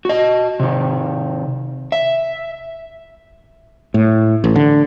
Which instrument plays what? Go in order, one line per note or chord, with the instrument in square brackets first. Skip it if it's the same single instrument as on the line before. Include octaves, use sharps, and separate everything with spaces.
[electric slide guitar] F#4 D#5
C3 D#3
E5
[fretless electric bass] A2
A1
D3